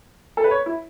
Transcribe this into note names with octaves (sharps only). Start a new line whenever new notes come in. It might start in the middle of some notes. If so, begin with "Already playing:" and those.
A4
B4
C#5
E4